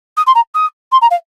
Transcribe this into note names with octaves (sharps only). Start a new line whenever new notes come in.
D#6
C6
A#5
D#6
C6
A#5
F5